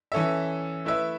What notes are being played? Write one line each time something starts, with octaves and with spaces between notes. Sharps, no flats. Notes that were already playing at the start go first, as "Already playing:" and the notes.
E3 C#4 A4 E5
A3 E4 B4 E5